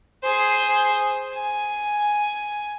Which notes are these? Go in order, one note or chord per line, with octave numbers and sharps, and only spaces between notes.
G#4 C5
G#5